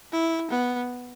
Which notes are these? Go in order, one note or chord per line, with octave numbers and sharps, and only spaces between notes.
E4
B3